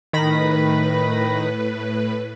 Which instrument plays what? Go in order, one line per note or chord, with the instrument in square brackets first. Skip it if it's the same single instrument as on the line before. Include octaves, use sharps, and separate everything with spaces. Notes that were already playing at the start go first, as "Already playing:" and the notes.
[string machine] A2 B4 [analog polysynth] D#3 B5 A#6